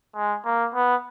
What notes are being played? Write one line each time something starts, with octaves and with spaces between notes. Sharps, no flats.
G#3
A#3
B3